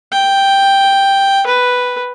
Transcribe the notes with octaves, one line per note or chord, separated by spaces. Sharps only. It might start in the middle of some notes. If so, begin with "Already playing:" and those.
G5
B4